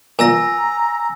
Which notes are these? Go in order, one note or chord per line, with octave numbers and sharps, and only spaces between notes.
A#2 G#5 A#5 E6 A#6